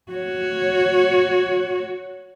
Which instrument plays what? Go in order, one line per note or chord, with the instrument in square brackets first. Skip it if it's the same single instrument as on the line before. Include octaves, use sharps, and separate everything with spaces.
[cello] F#4 C#5